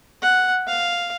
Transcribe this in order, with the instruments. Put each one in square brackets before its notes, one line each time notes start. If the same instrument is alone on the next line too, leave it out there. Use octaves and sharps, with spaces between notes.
[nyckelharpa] F#5
F5